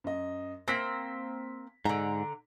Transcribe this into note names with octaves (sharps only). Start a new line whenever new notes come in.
F#2 D#5
A#3 C4 A#6 B6
G#2 D3 A#5